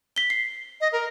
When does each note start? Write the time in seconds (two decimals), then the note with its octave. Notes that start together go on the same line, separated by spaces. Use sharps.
0.16 B6 G7
0.30 C7
0.81 D#5
0.93 A#4